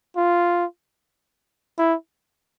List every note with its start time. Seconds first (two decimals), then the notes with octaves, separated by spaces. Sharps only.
0.17 F4
1.78 E4